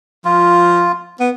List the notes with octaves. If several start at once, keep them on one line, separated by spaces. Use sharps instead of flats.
F3 F4
B3